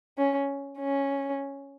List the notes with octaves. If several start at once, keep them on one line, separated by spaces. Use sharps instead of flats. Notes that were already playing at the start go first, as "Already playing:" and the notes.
C#4
C#4